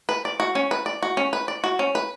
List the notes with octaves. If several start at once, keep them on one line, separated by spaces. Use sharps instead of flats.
B4
D5
F#4
C#4
B4
D5
F#4
C#4
B4
D5
F#4
C#4
B4